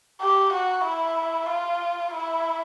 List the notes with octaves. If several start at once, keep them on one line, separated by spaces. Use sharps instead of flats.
G4
F#4
E4
F4
E4